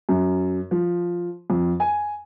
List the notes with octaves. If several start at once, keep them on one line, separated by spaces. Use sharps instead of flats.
F#2
F3
F2
G#5